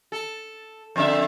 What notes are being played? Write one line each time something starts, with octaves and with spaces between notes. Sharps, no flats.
A4
F2 D3 E5